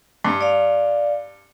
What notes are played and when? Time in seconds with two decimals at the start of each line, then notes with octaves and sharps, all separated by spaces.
0.24 G2
0.41 D5 F5